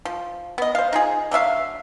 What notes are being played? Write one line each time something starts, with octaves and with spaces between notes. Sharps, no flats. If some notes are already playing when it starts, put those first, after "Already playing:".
F3
B3 D#5
C5 F5
D#4 F4 G#4
D3 F#3 E5 F5